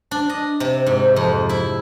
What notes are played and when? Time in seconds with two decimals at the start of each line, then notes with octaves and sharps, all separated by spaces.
0.11 D4
0.29 D#5
0.60 C3
0.87 G#2
1.16 F2
1.49 E4